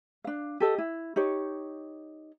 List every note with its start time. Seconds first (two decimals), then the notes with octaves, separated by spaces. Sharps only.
0.24 D4 F5
0.60 G4 A4 D#5
0.78 E4
1.16 D#4 G4 C#5